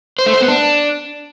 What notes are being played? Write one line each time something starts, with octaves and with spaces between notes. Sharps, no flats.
C5
A3
C5
B3
D4